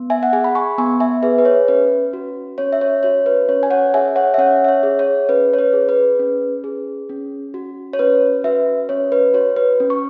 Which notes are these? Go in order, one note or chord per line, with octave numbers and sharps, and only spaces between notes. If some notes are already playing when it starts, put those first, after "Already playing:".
Already playing: B3
E5 G#5
F#5
G#4 G#5
B5
G#5 C#6
B3 G#5 C#6
E5 G#5
G#4 B4 E5
B4
C#5
C#4 B4
F#4
C#4 C#5
E5
C#5
F#4 C#5
B4
C#4 C#5
G#5
C#5 F#5
G#4 E5 G#5
C#5 F#5
E5
C#4 C#5 F#5
E5
C#5
G#4
C#5
C#4 B4
C#5
B4
G#4
B4
C#4
G#4
C#4
F#4
C#5
C#4 B4
F#4 B4 E5
C#4 C#5
B4
F#4 C#5
B4
C#4
C#6